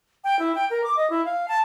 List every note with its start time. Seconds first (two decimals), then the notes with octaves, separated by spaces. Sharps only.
0.24 G5
0.39 E4
0.55 G5
0.70 A#4
0.84 D6
0.97 D#5
1.10 E4
1.25 F5
1.48 A5